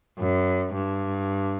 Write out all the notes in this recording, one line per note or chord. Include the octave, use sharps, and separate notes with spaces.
F#2
G2